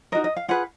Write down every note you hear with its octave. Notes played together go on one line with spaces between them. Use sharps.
D#4 F#4 A#4 D#5
D#5
F5
F4 G#4 B4 F#5